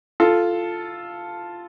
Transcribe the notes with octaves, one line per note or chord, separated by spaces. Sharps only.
F4 A4